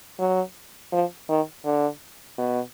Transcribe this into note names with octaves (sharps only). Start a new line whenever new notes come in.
F#3
F3
D#3
D3
B2